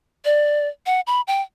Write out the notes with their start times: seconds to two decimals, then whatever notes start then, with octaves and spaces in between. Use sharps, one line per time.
0.25 D5
0.86 F#5
1.07 B5
1.27 G5